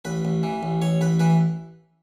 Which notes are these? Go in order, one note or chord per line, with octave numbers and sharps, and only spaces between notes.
A1 B4
A1
E3
A1
A1 C#5
A1 B4
E3 B4